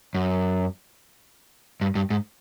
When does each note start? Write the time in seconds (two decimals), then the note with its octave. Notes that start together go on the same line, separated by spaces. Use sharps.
0.15 F#2
1.81 G2
1.95 G2
2.10 G#2